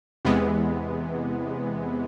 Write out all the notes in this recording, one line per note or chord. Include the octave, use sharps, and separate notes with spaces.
E2 C3 E3 G#3 B3